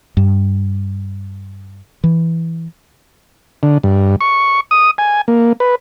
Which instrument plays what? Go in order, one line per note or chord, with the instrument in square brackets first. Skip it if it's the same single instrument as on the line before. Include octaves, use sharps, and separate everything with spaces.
[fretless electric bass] G2
E3
[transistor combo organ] D3
G2
C#6
D#6
G#5
A#3
B4